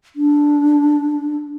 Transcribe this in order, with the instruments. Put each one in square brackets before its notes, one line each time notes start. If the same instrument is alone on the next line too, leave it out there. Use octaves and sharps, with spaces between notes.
[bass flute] D4